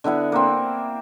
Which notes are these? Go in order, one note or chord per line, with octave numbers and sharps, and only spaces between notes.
D3 B3 E4 F#5
A#3 C4